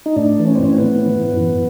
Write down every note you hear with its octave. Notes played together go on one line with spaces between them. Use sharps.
D#4
A2 D4
E3
C#4
C4
A2 C#4
C4
B3
E3
E3
F#2